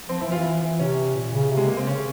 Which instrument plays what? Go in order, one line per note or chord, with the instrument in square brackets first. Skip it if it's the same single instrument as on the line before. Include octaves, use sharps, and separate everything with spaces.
[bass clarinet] F3 [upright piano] C4
[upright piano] E4
[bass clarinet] E3
[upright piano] F4
[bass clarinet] E3 [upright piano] E4
[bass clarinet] E3
[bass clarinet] C3 [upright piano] C#4
[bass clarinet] A#2
C#3
C3
[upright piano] G#3
A#3
C4
[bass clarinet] C#3 [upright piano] C#4